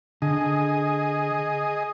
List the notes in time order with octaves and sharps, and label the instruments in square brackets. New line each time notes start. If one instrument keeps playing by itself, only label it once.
[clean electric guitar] D3 [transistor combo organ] G#4 D#5